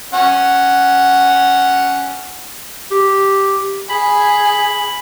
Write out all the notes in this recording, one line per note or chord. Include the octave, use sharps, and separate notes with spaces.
C#4 F#5
G4
G#4 B5